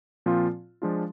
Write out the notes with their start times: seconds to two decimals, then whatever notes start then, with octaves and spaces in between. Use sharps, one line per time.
0.26 A#2 F3 C4 F4
0.82 F3 G#3 D4 F4